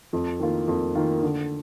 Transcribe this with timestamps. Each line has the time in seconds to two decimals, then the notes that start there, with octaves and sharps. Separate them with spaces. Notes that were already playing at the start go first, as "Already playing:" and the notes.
0.13 F2
0.40 D#3 A#3 F4
0.68 F2
0.95 D#3 A#3 F4
1.23 D3